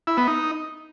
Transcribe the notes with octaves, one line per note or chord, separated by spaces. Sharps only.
E4
B3
D#4